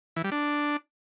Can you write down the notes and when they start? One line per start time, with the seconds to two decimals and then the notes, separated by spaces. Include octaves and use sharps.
0.16 E3
0.24 G3
0.32 D4